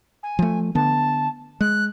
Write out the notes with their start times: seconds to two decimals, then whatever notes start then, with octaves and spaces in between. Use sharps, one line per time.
0.23 G#5
0.39 F3 A3
0.75 D3 B3 A5
1.61 G#3 F#6